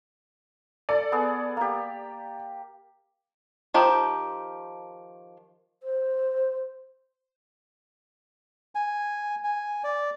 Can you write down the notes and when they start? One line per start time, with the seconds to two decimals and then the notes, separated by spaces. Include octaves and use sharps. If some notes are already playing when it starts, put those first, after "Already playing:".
0.89 A4 D5
1.12 B3 G#4 A4
1.57 A#3 G4
3.74 D#3 F3 G4
5.83 C5
8.75 G#5
9.44 G#5
9.84 D5